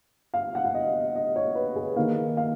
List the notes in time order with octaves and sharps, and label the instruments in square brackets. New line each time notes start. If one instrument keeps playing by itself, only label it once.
[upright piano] F5
F#5
F5
D#5
D#5
C#5
B4
G#4
D#3 A#3 F5
F5